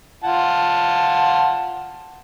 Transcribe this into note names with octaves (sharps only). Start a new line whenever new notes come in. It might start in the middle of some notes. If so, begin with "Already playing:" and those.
F4 F#5 A5